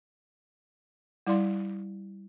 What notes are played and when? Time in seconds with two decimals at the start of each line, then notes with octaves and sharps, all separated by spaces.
1.27 G3 E4 D5 F5 C6